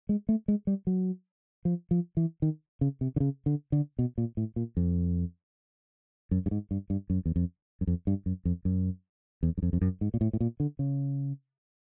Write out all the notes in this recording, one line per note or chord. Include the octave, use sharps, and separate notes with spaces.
G#3
A3
G#3
G3
F#3
F3
F3
E3
D#3
C#3
C3
D3
C#3
D3
D3
B2
A#2
A2
A#2
F2
F#2
G2
G#2
G2
G2
F#2
E2
F2
F#2
F2
G2
F#2
F2
F#2
E2
F#2
F2
F2
F#2
G#2
A#2
A2
A2
A#2
D3
C#3